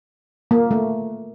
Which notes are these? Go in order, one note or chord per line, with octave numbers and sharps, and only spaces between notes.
A#3
A3